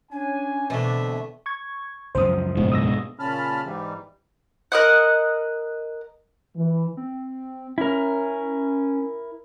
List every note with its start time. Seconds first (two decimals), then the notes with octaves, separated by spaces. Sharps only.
0.12 C#4 D4 G#5
0.70 B2 D3 E3 A3 C4 D4 E5
1.46 C#6 G#6
2.15 C#2 F#2 F3 C5 D#6
2.57 G#2 B2
2.72 D#6 E6 A#6
3.19 A#2 C#3 C#4 A5 B5 F6
3.65 G#2 E3 G3
4.72 A#4 D#5 F#5
6.56 E3
6.97 C4
7.78 C#4 E4 A#4